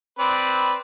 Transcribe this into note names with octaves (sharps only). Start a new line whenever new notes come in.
C4 B4 D5